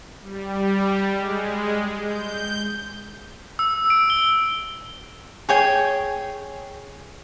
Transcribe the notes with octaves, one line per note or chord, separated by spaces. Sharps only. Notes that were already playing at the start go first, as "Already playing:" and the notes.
G3
G#3
G6
E6
D7
G7
G#4 C#5 G5